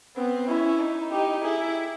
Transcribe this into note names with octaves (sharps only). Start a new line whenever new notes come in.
B3 C4
C#4 E4
D#4
D#4 G4
E4 G#4